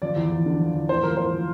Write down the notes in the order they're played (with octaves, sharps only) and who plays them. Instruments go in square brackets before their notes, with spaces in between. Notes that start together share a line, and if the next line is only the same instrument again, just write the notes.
[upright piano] F3 D5
E2
E2
D3
F3
E2
A2 C5
F3 A#4
A2 C5
F3